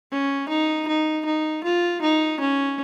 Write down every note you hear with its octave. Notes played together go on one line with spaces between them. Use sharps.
C#4
D#4
D#4
D#4
F4
D#4
C#4